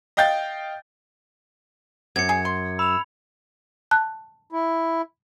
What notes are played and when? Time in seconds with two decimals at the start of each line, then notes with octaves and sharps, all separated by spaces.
0.17 D#5 F5 G5 G6 A6
2.16 F#2 G#6 C#7
2.29 G#4
2.45 C6
2.79 B5 E6 F7
3.91 A5 F#6
4.52 E4